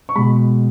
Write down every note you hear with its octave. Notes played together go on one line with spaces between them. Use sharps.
C#6
B2 G#3 B5